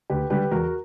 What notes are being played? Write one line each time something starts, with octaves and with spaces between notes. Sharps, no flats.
D2 G4 B4
D3 G3 G4 B4
E2 F#4 A#4